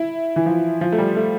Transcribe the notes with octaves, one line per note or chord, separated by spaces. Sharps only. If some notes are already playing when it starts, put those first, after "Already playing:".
Already playing: E4
E3
F3
F3
A3
G3
A3